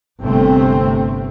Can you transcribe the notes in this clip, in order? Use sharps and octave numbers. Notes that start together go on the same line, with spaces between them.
G1 C3 A3 C4